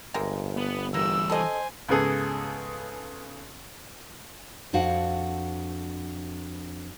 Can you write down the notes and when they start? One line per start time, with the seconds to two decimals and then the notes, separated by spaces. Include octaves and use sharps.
0.14 G1 C3 G#3 A#3
0.57 B3
0.94 E3 G3 A#3 E6
1.30 A4 C5 D#5 G#5
1.88 C#2 G#2 C#3 B3 G#4 A4
4.73 F2 D4 F#4 C5 F5 F#5